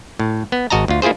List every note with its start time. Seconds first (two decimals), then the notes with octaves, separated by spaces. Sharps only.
0.20 A2
0.52 B3
0.70 G#1 F#4 D#5 A5 A#5
0.88 D2 F4
1.02 A#3 E4 F4 G#4 C5